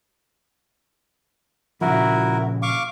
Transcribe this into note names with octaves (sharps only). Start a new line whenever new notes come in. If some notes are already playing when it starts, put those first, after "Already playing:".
A#2 C#3 F3 E4 F#4 A#4
F5 C#6 D6